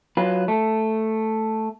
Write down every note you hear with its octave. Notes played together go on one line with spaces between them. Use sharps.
F#3 F4 B4
A3